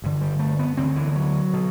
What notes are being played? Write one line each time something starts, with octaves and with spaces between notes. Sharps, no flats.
G1 G2 D3
G3
A3
B3
D2 D3 C4
E3
F#3
B2